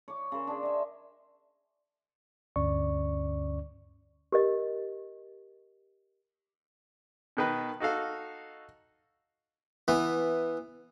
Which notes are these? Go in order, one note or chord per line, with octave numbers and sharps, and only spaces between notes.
C#5 D6
C#3 A#4 C5
D4 G#4
D#5 E5
D2 G2 D3 C#4 D5 C#6
G4 A#4 D#5
B2 D#3 B4
D#4 F#4 A4 F5
E3 B3